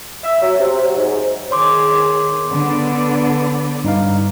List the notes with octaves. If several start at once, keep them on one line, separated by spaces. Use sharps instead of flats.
E5
F#3
C3
F#3
G#2
D#3 G#4 C#5 C6 D6
D3 B3 D5
G2 D#4 F5